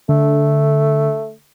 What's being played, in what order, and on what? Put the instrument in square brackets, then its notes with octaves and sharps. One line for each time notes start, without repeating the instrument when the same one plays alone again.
[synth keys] D3 [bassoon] A3